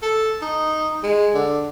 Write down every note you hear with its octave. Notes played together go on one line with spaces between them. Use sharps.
A4
D#4
G#3
D3